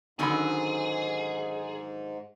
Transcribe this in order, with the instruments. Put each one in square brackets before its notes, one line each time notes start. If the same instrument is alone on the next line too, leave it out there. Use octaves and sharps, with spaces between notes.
[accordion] G#2 [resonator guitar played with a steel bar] D3 D#3 F#3 [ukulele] C#4 D#4 B5 [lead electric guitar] G#4